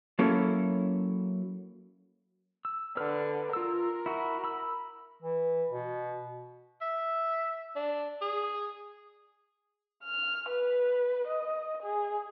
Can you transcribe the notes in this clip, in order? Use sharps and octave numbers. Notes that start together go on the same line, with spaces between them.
F#3 A#3 C#4 E4 A4
E6
D3 B4 F6
F4 A#4 E6
E4 F#4
B5 E6
E3
B2
E5
D4
G#4
F6
B4
D#5
G#4